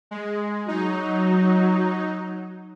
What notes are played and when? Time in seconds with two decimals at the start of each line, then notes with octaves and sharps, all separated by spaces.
0.11 G#3
0.68 F#3 D#4